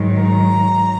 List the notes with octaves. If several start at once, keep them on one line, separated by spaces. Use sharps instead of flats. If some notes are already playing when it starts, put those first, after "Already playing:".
Already playing: G#2 D#3 F#3
A#5